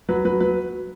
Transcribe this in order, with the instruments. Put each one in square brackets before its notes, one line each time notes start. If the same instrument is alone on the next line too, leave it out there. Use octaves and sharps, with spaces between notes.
[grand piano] F#3 B4
F#3 B4
F#3 B4